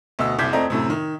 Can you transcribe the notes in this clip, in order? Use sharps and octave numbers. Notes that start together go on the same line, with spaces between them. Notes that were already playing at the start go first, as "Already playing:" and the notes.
D2 B2 D#5 E6
F#1 C2 D6 G6 G#6 B6
F2 A3 C4 D5 D#5 A#5
F#2 A2 C3
D#3